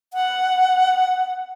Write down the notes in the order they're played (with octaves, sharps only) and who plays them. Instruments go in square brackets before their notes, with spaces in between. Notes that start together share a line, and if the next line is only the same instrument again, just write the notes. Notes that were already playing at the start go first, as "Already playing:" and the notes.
[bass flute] F#5